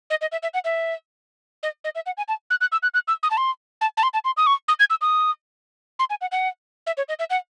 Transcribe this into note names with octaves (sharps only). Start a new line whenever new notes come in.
D#5
D#5
E5
E5
F#5
E5
D#5
D#5
E5
F#5
G#5
A5
F#6
F#6
E6
F#6
F#6
E6
D#6
A5
C6
A5
A5
C6
A5
C6
D#6
C#6
D#6
G#6
E6
D#6
C6
G#5
F#5
F#5
E5
C#5
D#5
E5
F#5